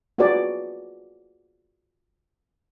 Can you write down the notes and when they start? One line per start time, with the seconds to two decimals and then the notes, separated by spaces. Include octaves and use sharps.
0.18 F4 F#4 G#4 B4 D5 A#5